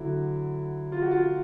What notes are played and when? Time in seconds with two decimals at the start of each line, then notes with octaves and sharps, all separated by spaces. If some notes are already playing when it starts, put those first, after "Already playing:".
Already playing: D3 F#3 A3 E4
0.92 F4
1.02 F#4
1.11 F4